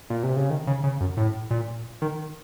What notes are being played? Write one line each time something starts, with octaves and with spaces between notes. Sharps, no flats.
A#2
C3
C#3
D#3
C#3
C#3
F#2
A2
A#2
D#3